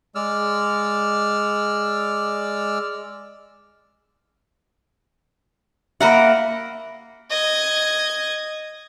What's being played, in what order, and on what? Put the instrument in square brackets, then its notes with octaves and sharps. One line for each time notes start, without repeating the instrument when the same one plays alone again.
[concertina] G#3 D5 E6 F6
[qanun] A#3 A#4 F#5 [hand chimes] E5 B5
[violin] D#5 G#6